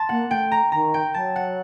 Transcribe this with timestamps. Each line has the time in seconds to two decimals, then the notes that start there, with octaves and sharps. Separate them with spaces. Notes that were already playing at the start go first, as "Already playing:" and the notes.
Already playing: A5 C6
0.09 A#3 F#5
0.30 A3 G5
0.52 A#5
0.72 D#3 A#5
0.94 G5
1.14 F#3 A5
1.36 F#5